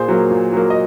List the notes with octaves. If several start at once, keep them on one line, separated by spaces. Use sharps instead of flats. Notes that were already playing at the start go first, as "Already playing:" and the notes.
Already playing: A#2 G#4 C5
F#3 A#3
A#2
F#3 A#3
D#5